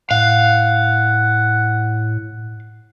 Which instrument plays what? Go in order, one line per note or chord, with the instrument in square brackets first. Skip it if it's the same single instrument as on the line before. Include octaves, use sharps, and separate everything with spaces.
[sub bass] A2 [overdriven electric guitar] F5 [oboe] F#5